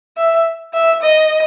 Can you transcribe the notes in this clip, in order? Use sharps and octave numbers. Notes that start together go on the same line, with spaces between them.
E5
E5
D#5